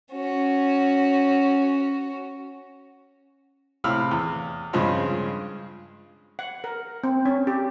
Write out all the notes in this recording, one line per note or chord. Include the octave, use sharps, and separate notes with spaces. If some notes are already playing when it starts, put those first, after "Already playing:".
C#4 F#4
A2 C3 F5 B5 E6 F6
E2
G2 C#3 F3 G#3 C4
F#5
A#4
C4
C#4
G4